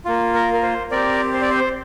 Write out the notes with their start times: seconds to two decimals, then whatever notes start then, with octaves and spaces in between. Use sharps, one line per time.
0.05 A#3 F4
0.34 A#4
0.54 A#4
0.63 C5
0.91 C4 G4 A#4 D5
1.34 C5
1.42 D5
1.50 C5